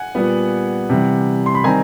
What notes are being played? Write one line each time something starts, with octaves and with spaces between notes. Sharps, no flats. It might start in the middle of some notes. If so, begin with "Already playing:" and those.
Already playing: F#5 G#5
A#2 G3 B3
C3 E3 G3
C6
B5
D#3 G3 C4 G#5 A#5